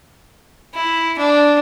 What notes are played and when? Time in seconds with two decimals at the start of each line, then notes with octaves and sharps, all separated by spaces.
0.74 E4
1.18 D4